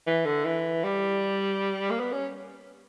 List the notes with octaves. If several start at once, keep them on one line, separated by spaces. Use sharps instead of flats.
E3
D3
E3
G3
A#3
B3
C#4